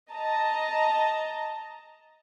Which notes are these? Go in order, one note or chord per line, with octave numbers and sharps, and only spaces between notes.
D#5 A5 A#5